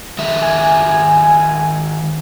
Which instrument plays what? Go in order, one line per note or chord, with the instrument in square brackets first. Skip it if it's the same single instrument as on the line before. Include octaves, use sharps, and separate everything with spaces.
[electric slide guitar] D#3 G#3 E5
[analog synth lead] G#5